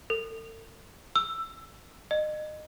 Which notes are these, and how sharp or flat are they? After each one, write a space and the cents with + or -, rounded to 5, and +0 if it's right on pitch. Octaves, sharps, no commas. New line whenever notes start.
A4 +40
E6 +10
D#5 -25